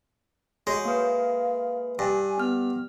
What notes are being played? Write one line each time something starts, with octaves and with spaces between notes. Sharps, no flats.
G#3 F#4 C#5
A#3 B4 F5
G2 G#5
B3 F6